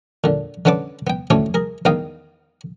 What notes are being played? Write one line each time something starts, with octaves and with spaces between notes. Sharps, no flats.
A#2 D3
D3 C#4 B4 F#5 A5 D6
B3 G5
D2 A2 A3 C#4 C#5
G#4 A#4
E2 D#3 B3 F5 G5 D#6